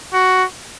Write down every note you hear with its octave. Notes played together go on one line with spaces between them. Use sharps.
F#4